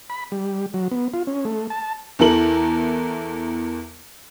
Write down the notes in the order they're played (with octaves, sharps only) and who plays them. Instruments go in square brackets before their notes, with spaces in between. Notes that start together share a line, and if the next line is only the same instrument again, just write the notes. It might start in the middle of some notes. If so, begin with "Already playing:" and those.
[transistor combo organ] B5
G3
F#3
B3
F4
C#4
A3
A5
[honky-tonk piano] E2 E3 A4 A#4 F#7